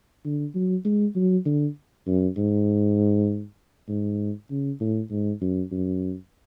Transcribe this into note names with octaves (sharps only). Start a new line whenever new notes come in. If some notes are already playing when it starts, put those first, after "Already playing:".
D3
F#3
G#3
F#3
D3
F#2
G#2
G#2
C#3
A2
G#2
F#2
F#2